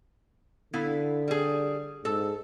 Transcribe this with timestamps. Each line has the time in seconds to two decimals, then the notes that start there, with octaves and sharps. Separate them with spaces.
0.73 D3 B3 E4 F5
1.28 G3 G#4
2.05 G#2 A4